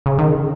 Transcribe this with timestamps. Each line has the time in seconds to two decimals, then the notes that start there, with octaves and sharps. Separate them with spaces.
0.06 C#3
0.19 D#3
0.30 C#3